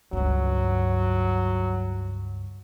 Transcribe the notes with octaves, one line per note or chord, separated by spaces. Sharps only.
C#2 G2 F#3